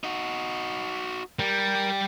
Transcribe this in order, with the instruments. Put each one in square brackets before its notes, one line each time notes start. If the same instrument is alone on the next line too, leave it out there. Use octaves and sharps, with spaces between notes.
[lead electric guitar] D#4 F#4
[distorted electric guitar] G3 [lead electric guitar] A#4